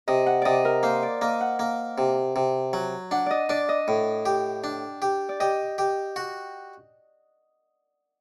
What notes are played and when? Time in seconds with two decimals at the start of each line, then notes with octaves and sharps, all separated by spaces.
0.08 C3 D#5
0.26 F#5
0.42 C3 D5 D#5
0.65 A#4
0.83 A#3 C5
1.03 D5
1.21 A#3 D#5
1.41 F#5
1.59 A#3
1.98 C3
2.36 C3
2.73 F#3
3.11 D4 F#5
3.26 D5 D#5
3.49 D4 D5
3.69 D#5
3.88 A2
4.26 G4
4.64 D4
5.02 G4
5.29 D5
5.40 G4 D#5
5.78 G4
6.16 F#4